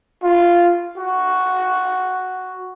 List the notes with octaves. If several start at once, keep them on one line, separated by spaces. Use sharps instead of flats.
F4
F#4